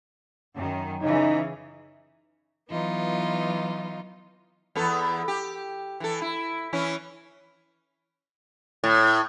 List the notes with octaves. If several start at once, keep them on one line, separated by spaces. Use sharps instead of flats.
F#2 D#3
C#3 E3 D#4
E3 F#3 B3 D#4 F4
E2 B3 A4
G4
E3 A4
E4
E3 C#4 E4
A2